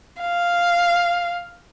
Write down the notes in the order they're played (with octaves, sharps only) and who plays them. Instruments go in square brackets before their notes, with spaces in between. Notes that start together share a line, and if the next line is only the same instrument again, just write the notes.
[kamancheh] F5